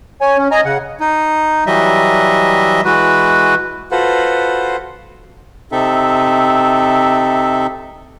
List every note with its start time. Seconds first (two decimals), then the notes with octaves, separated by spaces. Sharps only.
0.21 C#5 G#5
0.37 C#4
0.51 D#5 G#5 A#5
0.65 C#3 F#5
1.00 D#4
1.66 E3 F#3 G3 D#5 E5
2.84 E3 G#3 F#4 B4
3.91 F4 F#4 A4 B4 C5 F#5
5.72 C3 C4 D#4 A4 E5